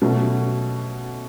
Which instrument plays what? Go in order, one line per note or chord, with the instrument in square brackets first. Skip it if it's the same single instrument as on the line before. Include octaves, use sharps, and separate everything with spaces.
[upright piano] B2 F#3 A3 C#4